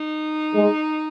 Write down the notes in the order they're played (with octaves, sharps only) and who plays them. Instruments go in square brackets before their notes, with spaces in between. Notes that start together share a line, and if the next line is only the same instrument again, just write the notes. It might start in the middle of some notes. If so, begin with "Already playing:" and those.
Already playing: [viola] D#4
[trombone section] G#3